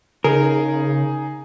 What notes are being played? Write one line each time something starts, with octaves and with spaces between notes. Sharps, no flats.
C#3 D#4 G#4 A#4